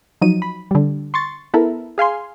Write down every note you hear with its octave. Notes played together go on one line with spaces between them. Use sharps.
F3 F#3 D#4 D#7
B5
D3 G3
C6 C#6 A6
B3 E4 A4 A#4
G#4 F5 G#5 C6